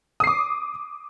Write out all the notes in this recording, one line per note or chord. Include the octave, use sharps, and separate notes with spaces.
D6 D#6 C7